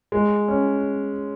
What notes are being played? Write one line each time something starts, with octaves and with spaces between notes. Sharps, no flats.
G#3
C#4